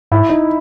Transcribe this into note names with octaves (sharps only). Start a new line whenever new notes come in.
G#2 E4
D#4